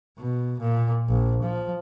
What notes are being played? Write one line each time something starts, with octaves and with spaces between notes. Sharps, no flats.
B2
A#2
A#1
F3